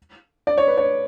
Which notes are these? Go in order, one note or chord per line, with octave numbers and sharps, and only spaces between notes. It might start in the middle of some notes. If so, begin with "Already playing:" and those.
D5
C#5
B4
C#5